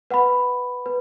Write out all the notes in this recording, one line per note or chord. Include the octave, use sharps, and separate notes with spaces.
B4 F#5 B5
B4